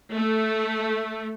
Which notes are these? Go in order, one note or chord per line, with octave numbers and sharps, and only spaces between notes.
A3